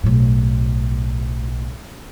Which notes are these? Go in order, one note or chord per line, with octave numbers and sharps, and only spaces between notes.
B1 A2